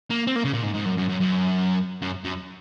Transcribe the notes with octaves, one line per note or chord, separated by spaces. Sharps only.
A#3
C4
A#3
C#3
A#2
G#2
G#2
F#2
F#2
F#2
F#2
F#2
F#2